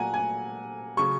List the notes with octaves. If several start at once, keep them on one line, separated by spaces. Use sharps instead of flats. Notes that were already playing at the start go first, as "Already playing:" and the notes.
Already playing: A#2 F#3 F#5 G#5 A#5
G#5
C#3 F#3 C#6